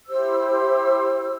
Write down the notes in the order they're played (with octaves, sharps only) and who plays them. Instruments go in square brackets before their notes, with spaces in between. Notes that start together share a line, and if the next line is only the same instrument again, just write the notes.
[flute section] E4 G4 C5 E6